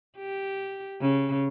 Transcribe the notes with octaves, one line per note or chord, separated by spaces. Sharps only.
G4
C#3